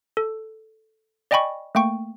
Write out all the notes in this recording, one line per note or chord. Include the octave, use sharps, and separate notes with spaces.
A4
D5 D#5 G5 G#5 B5 C#6
A3 A#3 G5 C#6